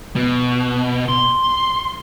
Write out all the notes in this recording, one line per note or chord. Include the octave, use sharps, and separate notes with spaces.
B2
C6